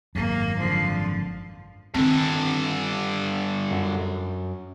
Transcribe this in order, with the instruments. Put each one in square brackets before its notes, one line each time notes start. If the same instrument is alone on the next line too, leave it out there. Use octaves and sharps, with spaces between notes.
[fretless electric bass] G#1 F#2 [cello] A#3
[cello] D3 F3
[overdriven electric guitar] G2 D3 [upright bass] D#3 C4
[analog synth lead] F#2